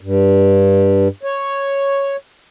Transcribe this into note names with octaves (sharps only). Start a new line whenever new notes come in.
G2
C#5